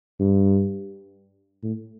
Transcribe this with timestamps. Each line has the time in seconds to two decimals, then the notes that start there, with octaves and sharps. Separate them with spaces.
0.20 G2
1.63 A2